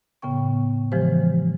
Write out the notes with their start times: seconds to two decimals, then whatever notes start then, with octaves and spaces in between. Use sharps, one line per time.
0.22 A2 C#3 B3 G5 C#6
0.92 C#3 E3 F3 G#3 G4 C5